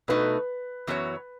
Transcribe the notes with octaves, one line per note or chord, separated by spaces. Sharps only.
B2 A3 D#4 F#4 B4
F#2 E3 B3 F#4 C#5